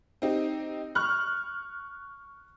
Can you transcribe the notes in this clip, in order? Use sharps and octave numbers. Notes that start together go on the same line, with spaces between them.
C4 D#4 G4
C#6 F6 F#6